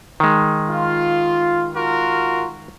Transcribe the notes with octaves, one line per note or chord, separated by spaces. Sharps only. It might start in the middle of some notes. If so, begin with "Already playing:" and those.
D#3 G#3
F4
F4 F#4 A#4